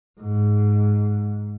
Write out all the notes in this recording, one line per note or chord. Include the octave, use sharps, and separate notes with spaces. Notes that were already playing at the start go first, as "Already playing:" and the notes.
G#2